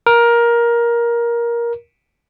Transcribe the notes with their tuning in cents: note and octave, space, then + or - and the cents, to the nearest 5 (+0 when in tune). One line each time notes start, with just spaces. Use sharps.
A#4 +15